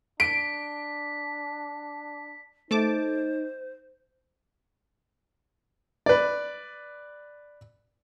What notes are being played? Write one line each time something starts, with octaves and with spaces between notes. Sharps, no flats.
D4 B6 D7
A3 D#4 C5 A5 D6
B4 D5